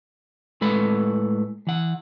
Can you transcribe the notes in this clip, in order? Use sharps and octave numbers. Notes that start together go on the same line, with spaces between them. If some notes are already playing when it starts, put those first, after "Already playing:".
A2 G#3 A4 B4 B5
E3 F#5